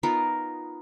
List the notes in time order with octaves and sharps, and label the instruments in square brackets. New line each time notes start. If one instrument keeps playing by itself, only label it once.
[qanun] B3 D#4 F4 A#4